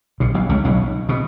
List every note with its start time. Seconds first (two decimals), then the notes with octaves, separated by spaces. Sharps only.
0.20 B1 B2
0.34 B1 B2
0.49 C#2 C#3
0.65 B1 B2
1.09 B2